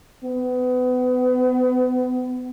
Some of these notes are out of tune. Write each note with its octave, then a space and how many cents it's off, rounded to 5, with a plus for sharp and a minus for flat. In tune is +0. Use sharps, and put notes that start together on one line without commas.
B3 +30